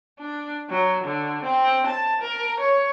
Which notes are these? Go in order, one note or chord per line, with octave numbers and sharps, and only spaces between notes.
D4
F#3
D3
C4
A5
A#4
C#5